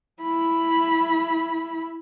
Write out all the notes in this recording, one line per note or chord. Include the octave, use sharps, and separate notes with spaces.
E4 B5